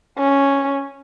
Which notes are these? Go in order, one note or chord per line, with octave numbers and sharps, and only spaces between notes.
C#4